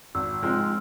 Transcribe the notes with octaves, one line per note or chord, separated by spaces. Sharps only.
G#1 E6
G#2 F3 G#3 C4 F6